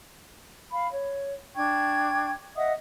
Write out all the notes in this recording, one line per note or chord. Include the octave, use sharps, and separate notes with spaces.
F5 B5
C#5
D4 G5 C#6 G#6
D#5 E5 F#5 D#6